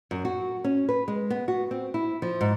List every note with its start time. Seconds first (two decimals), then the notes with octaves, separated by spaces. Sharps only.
0.11 F#2
0.25 F#4
0.64 C#4
0.89 B4
1.08 G#3
1.30 B3
1.48 F#4
1.71 C4
1.94 E4
2.22 F3
2.41 G#2